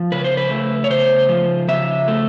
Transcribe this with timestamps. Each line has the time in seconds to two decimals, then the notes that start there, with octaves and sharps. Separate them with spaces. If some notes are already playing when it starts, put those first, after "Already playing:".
Already playing: F3
0.12 C#3 B4
0.24 C5
0.37 B4
0.50 A3
0.84 C#5
0.90 C#3 C5
1.29 F3
1.68 C#3 E5
2.08 A3